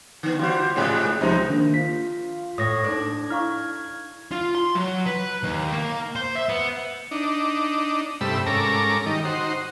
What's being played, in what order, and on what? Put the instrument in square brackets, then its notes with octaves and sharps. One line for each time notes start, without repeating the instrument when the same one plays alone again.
[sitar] D3 B3
[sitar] G3 F#4 C5 [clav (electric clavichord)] F4
[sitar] G#2 G3 G#3 [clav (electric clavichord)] C#3
[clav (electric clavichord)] C#2 C3 C5 [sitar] F3 D#4
[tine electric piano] D#3 D4 [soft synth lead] A#3
[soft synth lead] F4 [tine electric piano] B6
[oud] A2 [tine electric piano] D#6 A#6 [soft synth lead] G#6
[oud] D4 [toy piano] D#4 A4 C5
[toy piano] E4 F5 C#6 [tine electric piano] F6
[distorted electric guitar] F4
C6
F#3
B4
D#2
A#3
C5
E5
B3
[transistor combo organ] D4 D#4
G2 C3 G3 A3 B5 E6
G#2 C#4 A4 A#4 A#5 D6
D#3 G3 D#4
D#4 F#4 C5